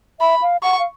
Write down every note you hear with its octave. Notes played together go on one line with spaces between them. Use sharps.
E5 B5
F5
F#5 C#6
F5